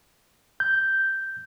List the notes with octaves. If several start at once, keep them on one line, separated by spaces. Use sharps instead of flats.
G6